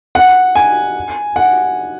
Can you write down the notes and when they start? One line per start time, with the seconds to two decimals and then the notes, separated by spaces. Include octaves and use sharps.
0.15 F#5
0.55 G#5
1.36 F#5